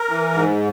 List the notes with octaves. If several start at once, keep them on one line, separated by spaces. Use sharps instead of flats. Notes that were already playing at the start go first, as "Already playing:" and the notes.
Already playing: A#4
E3
G#2